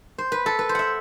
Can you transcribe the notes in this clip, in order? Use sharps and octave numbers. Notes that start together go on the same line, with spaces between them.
C5
B4
A4
B4
C5
E5 F#5